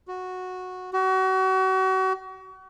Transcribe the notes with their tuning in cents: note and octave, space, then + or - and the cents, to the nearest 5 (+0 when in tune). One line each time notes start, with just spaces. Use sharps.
F#4 -10
F#4 +35